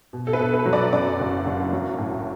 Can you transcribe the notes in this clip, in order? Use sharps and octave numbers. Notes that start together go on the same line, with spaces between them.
B2
A4
B4
B2
B4
F#3
D5
F#2 D5
F#1
F#1
F#3
A2